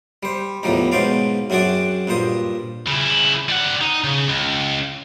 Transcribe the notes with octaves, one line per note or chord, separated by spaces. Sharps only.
G3 C5
E2 A2 F3 G3 D#4
G#2 B2 C#4 C5 D5 F5
F#2 C4 D4 F#4 G#4 D5
G2 A#2 C5 D#6
C#3 E4
G3 F#5
D#4
C#3
C#2